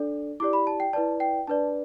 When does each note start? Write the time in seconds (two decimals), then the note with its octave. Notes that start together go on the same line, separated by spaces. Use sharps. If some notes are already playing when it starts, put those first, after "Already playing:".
Already playing: D4 A4 D5
0.40 E4 G4 D5 D6
0.53 B5
0.67 A5
0.80 G5
0.93 E4 B4 D5 A5
1.20 G5
1.47 D4 B4 D5 A5